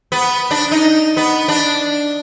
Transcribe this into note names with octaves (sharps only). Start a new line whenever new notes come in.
B3
D4
D#4
B3
D4